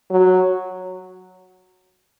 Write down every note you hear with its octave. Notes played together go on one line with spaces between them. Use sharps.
F#3